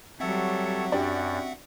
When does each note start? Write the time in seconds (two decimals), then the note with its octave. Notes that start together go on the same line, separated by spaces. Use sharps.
0.20 F#3 G3 C4 A4 C#5 E5 F#5
0.92 F#2 D4 F#4 G4 D5